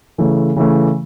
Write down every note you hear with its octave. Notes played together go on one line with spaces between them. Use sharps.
C#3 E3 A3
C#3 E3 A3